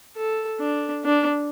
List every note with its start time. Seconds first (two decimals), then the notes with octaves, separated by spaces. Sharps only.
0.16 A4
0.60 D4
1.05 D4